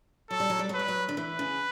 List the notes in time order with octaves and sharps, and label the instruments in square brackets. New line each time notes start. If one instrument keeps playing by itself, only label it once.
[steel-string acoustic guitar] F#3 [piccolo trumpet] A4
[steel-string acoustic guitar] G3
F#3
G3
F#3
[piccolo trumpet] B4
[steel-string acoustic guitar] G3
F#3
D3
[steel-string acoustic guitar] E3 [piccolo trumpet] B4
[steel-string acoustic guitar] C#3